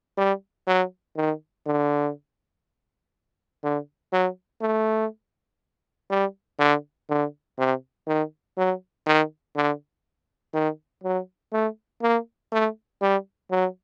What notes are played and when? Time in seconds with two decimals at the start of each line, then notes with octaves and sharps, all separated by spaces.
0.18 G3
0.67 F#3
1.17 D#3
1.66 D3
3.63 D3
4.12 F#3
4.62 A3
6.10 G3
6.59 D3
7.09 D3
7.59 C3
8.07 D#3
8.57 F#3
9.06 D#3
9.56 D3
10.54 D#3
11.03 F#3
11.53 A3
12.02 A#3
12.52 A3
13.02 G3
13.51 F#3